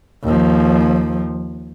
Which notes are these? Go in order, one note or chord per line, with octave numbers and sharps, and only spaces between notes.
D#2 F3